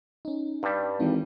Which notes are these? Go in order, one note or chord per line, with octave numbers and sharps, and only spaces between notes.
C#4 D#4
G2 G3
G#1 E3 D4